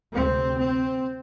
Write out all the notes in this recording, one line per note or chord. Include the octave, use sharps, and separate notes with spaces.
D2 C3 C4
C4